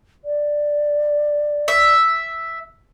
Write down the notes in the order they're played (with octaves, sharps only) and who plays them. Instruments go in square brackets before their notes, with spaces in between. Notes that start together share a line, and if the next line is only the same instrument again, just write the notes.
[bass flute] D5
[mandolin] E5